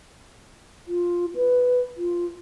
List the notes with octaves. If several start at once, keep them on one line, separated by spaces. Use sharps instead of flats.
F4
B4
F4